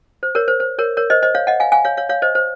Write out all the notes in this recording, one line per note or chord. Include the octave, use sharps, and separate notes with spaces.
C5
A#4 C#5
C5
C5
A#4 C#5
A#4 C#5
C5 D#5
C5 D#5
C#5 F5
D#5 F#5
F5 G#5
F5 G#5
C#5 F5
C#5 F5
C#5 F5
C5 D#5
C5